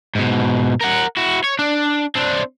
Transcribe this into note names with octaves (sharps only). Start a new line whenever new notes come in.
G#2 B2
A#4 F#5
E4 F#4
C#5
D4
C4 D4